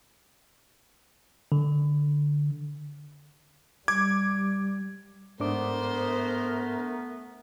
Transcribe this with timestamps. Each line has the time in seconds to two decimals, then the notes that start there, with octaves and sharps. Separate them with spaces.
1.52 D3
3.88 G3 D6 G#6
5.40 G#2 A3 B3 D4 A#4 C5 D6